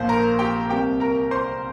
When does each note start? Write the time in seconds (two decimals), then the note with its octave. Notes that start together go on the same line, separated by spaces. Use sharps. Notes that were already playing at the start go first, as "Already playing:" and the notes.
Already playing: A#1 A#2 F3 C5
0.09 A#4 A#5
0.39 G4 G5
0.69 C2 C3 G3 A#3 G4 G5
1.00 A#4 A#5
1.31 C5 C6